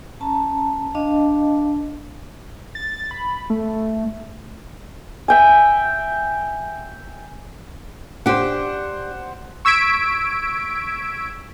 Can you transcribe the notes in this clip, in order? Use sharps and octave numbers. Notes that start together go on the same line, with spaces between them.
C#4 A5 A#5
D4 D#5 F5 A5
A6
B5
A3
E5 G5 G#5
D4 G4 C5 F#5
C#6 E6 G#6 B6 D7